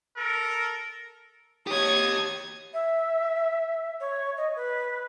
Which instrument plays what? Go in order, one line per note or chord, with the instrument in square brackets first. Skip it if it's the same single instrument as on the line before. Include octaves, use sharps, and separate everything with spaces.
[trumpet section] A4 A#4
[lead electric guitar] G4 C#5 [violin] D#6 G#6
[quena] E5
C#5
D#5
B4